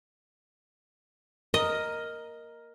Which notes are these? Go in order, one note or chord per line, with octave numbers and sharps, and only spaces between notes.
A#4 D#5